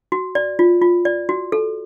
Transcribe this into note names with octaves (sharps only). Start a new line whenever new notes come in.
F#4
D5
F4
F4
D5
F#4
A4